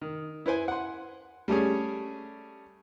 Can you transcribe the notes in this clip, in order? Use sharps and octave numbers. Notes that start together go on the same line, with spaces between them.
D#3
E4 B4 C5 G#5
F#5 C6
G3 A3 C#4 G#4